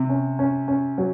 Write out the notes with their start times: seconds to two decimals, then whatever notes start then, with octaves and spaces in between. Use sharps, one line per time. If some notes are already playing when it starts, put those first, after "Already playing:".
Already playing: C3
0.09 C#4
0.39 C#4
0.68 C#4
0.98 F#3